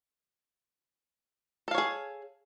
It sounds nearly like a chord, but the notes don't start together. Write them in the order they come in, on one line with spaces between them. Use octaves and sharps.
A4 F5 C#5 G#4